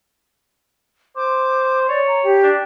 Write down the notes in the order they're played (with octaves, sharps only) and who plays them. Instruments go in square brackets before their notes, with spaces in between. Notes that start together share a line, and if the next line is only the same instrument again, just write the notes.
[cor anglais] C5 [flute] D6
[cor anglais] C#5 [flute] D5
[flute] A#5
G4
[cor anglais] D4